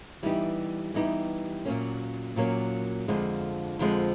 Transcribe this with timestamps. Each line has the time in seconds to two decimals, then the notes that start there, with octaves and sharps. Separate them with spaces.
0.23 E3 G3 B3 D#4 G4
0.94 E3 G3 B3 D#4 G4
1.65 A#2 F#3 A#3 C#4
2.36 A#2 F#3 A#3 C#4
3.08 F2 D3 F3 G#3
3.79 F2 D3 F3 G#3